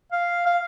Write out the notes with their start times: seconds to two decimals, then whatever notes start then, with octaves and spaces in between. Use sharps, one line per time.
0.12 F5
0.46 F5